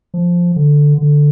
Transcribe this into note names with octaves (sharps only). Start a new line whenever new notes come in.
F3
D3
D3